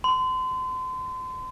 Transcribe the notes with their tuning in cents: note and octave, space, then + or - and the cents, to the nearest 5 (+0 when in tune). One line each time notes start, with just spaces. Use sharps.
C6 -35